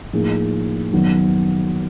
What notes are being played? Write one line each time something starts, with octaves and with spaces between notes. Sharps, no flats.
A2 F3 A#3 D#4 G#4
F#2 D#3 F#3 B3